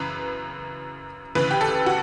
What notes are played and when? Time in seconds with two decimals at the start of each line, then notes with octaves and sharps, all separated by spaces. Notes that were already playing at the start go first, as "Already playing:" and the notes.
Already playing: F#2 C#3 E3 B4
1.35 D2 C#3 E3 B4
1.51 G4
1.61 A4
1.86 F#4